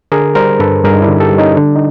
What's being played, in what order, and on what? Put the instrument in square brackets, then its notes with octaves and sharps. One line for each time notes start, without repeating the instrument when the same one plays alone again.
[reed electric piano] D3 G#4 A#4
G3 A#4 C5
G2 A4 B4
G2 G#4 A#4
D#4
D4 E4
D3
G4 A4
G3
C#4 D#4
D3 D4
D#4